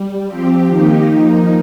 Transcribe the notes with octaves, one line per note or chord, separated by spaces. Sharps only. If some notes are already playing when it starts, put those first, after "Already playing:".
Already playing: G3
F3 C4 G4
D#3 A#3 D#4 G4
F3 A#3 D#4